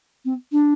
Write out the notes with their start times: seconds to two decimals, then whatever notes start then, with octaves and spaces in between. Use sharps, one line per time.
0.25 C4
0.52 D4